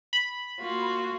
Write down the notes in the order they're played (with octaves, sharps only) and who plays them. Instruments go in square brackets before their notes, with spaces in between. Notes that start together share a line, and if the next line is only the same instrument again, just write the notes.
[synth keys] B5
[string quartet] A#3 F4 F#4